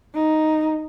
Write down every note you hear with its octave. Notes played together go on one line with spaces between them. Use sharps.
D#4